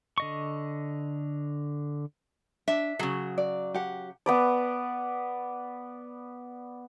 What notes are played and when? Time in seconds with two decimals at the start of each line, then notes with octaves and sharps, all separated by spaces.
0.18 D3 D#5 C#6
2.68 D4 E5
2.99 C#3 F#3 G#4
3.38 D5
3.74 G4 F#5
4.26 B3 B4 D5